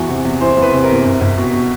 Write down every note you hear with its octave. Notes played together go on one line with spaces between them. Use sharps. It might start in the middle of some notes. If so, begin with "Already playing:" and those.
Already playing: E2 E3 F#4
C3
E2
E3 C5
E2 C5
B4
C3
A#4
E2
C2
C2
B2
B2